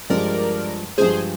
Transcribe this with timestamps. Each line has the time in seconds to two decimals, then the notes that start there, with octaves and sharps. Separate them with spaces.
0.10 G2 F3 G#3 A#4 D5
0.98 G2 F3 G#3 G#4 C5